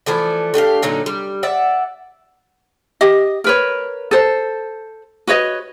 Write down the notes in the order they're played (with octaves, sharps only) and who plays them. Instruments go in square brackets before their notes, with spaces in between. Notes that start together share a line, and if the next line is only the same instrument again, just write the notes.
[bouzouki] E3 F3 A3 D5
A3 D4 G4 F5
A#2 D3 F#3 D#4
G3
D5 E5 F#5
[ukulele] G4 D#5
A#4 B4 C#5
A4 C5
F#4 B4 C#5 D#5